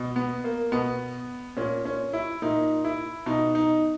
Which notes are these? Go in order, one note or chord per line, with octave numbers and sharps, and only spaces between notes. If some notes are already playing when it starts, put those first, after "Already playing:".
Already playing: B2
B3
A#3
B2 B3
A#2 C#4
C#4
E4
A#2 D#4
E4
B2 D#4
D#4